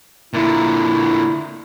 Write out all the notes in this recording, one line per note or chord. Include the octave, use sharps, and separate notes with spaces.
A#2 D3 E4